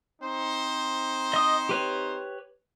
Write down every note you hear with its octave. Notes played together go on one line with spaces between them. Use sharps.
C4 D#4 C5
D#5 D#6
G4 B4 C#5